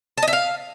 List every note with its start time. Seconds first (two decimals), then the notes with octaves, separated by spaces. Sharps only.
0.17 A5
0.23 D#5
0.28 E5
0.33 F5